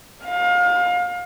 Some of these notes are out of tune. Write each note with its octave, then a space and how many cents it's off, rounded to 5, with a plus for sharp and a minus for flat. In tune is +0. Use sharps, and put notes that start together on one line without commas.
F5 +30